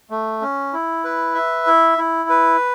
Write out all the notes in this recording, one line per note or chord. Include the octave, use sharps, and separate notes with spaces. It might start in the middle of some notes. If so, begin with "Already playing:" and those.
A3
C#4
E4
B4
E5
E4
E4
B4